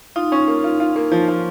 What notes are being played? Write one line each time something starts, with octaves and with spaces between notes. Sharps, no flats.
D#4 F4
C#4
A#3
F4
F4
A#3
F3
F3